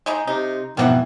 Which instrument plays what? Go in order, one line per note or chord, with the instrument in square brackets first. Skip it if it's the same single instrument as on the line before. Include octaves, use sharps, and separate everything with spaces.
[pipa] G#3 D#4 A#5
[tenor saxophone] C3 [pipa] D#4
[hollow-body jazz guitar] F2 G#2 B2 [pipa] D#3 F#4 F#5 [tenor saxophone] E3